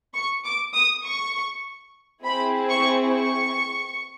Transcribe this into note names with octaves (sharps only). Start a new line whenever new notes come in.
C#6
D6
D#6
C#6
C4 E4 G#4 B5
C#6
C#6